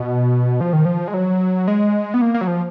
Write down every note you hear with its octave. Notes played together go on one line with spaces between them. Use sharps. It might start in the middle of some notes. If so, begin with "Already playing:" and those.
Already playing: B2
F3
D#3
F3
G#3
F#3
G#3
B3
A#3
A#3
F#3
F3